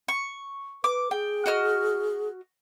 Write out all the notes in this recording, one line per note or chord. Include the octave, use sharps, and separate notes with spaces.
C#6
B4 D6
G#4 G5
F#4 D#5 F6